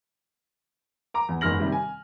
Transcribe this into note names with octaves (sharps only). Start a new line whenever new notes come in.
A#5 D6
E2
F#1 E2 G#2 F6 A#6 F#7
C3 D#3 G3
G#5